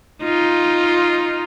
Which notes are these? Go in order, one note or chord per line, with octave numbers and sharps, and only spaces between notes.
D#4 F4